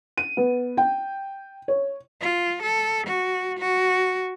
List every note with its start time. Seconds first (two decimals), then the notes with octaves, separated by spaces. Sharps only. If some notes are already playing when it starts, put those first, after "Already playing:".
0.18 D#7
0.37 B3
0.77 G5
1.68 C#5
2.21 F4
2.63 A4
3.07 F#4
3.59 F#4